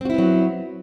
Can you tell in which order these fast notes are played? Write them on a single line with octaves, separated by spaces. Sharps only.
C4 F#4 E4 B3 F#3